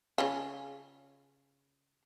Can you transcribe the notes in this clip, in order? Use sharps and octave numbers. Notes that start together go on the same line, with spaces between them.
C#3 C#4 F4